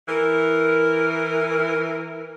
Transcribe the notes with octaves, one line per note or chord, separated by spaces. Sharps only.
E3 A#4